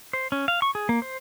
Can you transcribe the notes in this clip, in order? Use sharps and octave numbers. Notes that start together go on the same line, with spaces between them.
C5
C#4
F5
C#6
G#4
A#3
C5